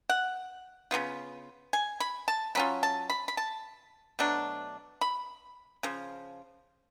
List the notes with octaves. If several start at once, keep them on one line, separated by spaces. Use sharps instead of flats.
F#5
C#3 F#3 B3 F4
G#5
B5
A5
F#3 C#4 F4 B5
A5
B5
B5
A5
B2 F#3 A3 D4
B5
C#3 F3